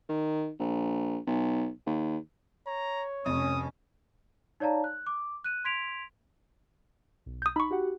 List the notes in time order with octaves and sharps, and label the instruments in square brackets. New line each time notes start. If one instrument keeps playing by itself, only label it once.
[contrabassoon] D#3
A#1
B1
D#2
[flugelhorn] C#5 [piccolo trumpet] A#5
[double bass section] F1 C#4 [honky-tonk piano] F2 [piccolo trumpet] D#6
[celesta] D#4 C#5 D5 F5 A5 A#5
F#6
D6
F#6 D#7
C6 G#6 B6 D7 F7
[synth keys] B1
[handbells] D#6 G6
[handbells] D#4 C#6 [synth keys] B5
[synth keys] F#4 G4 F#5